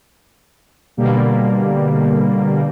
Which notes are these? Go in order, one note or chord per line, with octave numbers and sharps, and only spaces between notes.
B2 D3 G3 A#3